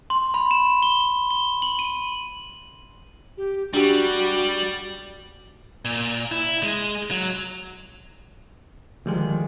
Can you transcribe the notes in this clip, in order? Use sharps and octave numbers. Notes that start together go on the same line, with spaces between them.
C6
B5
E7
G7
G7
F#7
D#7
G4
G3 D4 F#4 G4
A#2
E4
G#3
F#3
D2 D#3 F3 G3 G#3